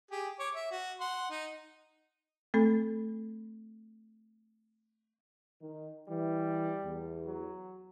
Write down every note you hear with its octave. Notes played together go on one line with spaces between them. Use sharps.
G4 G#4
C#5 D6
E5
F#4
F#5 C6
D#4
A3 C4 A4
D#3
E3 G3
E2
F#3